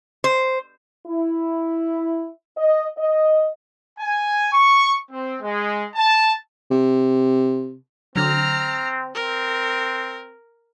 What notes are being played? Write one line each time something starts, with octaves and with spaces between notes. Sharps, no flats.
C5
E4
D#5
D#5
G#5
C#6
C4
G#3
A5
C3
D3 F#3 C4 A#5 F6
C4 A#4